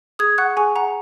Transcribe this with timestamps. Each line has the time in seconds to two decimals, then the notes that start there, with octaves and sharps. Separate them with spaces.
0.19 G#4 D#6 G#6
0.38 F#5 C#6 F#6
0.57 G#4 G#5 C#6
0.76 F#5 A#5